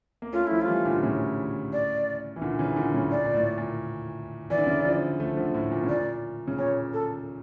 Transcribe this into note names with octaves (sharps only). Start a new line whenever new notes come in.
A#3
A3 C#4 F4
F3 A3 E4
F4
E3 G3
A#2 D3
A2 C#3
D5
E3
A#2 D3
C#3 E3
A#2 D3
A2 C#3
A#2 D5
A#2
A2
A#2
E3 D5
D3
C#3 E3
D3 F3
F3 A3
D3 F3
A2
A#2
C#3
A#2 D5
C#3
A#2 C#5
A4